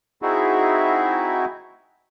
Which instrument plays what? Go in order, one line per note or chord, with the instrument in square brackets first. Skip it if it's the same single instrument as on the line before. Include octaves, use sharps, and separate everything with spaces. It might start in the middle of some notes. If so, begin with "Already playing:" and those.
[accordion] C4 D#4 E4 F#4 G#4 E5